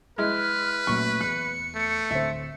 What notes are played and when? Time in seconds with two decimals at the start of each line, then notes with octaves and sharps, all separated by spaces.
0.18 G#3 E4 B4 F6
0.87 F#2 A#2 A3 C#6
1.21 E2 F#6 C#7
1.75 A3
2.11 D1 D3 C4 E5